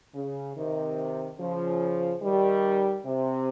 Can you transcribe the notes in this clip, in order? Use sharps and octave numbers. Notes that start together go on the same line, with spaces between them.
C#3
C3 D#3
C#3 F3
D#3 G3
C3